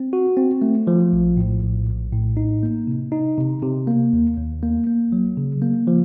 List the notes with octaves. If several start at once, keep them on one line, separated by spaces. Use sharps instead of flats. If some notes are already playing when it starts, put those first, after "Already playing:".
Already playing: C4
F#4
C4
A3
F3
A#1
A2
A#1
A#1
A2
D#4
A#3
C3
D#4
C3
C3
A#3
D#2
D#2
A#3
A#3
F#3
C#3
A#3
F3